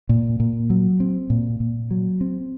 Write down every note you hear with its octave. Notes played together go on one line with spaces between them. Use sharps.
A#2
A#2
F#3
C4
A#2
A#2
F#3
C4